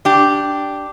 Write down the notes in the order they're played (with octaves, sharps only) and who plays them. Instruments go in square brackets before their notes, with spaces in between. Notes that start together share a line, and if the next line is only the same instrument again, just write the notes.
[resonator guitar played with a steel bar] D4 G4